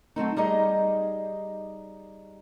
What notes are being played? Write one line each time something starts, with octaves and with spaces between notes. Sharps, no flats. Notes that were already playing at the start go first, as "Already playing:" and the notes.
F#3 A3 C4 D#4
G3 D#4 G4 G#4 D#5 A#5